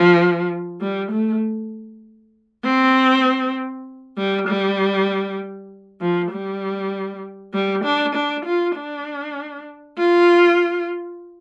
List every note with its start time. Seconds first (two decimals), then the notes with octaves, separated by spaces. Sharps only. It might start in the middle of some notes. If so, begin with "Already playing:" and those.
Already playing: F3
0.81 G3
1.11 A3
2.64 C4
4.17 G3
4.48 G3
6.01 F3
6.31 G3
7.54 G3
7.84 D4
8.15 D4
8.45 F4
8.76 D4
9.98 F4